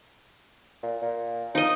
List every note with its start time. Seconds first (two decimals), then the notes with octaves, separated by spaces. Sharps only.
0.83 A#2
1.02 A#2
1.55 F3 D#4 D#5